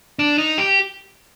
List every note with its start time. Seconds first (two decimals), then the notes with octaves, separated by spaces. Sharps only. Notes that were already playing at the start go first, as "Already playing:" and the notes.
0.19 D4
0.38 D#4
0.58 G4